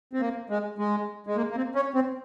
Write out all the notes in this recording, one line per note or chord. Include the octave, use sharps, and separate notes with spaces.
C4
A#3
G#3
G#3
G#3
A#3
A#3
C4
C#4
C4